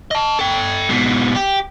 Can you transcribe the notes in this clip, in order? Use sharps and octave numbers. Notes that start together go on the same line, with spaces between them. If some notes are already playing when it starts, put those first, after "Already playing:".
D#5 A5
A4 G5
G#2 B2
G4